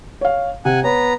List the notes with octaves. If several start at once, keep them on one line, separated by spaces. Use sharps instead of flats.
C#5 F5
C3 F#5 G#5
B3 C#5 A#5